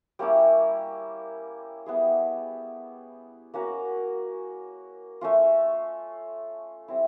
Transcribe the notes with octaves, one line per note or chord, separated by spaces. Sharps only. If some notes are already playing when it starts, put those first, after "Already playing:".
G3 A#3 C#4 E4
G3 B3 E4 G#4
A#3 C#4 F#4 A#4
A3 C#4 F4
G3 C4 E4